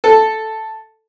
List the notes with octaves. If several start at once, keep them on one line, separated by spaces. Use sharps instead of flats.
A4